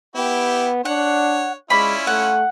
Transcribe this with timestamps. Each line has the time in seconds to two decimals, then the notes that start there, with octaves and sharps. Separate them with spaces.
0.16 B3 E4 G4 G5
0.85 D4 C#5 F#5
1.70 G#3 C#4 E4 F4 D5 B5
2.07 A3 F#5